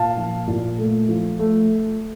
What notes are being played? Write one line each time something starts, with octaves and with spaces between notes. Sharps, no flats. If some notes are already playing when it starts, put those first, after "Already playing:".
Already playing: A#2 F5 A5
F3
A#2
A3
F3
A3